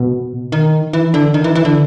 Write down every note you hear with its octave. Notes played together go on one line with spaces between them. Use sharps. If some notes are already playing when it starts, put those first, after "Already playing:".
Already playing: B2
D#3
E3
D3
D#3
E3
E3
D3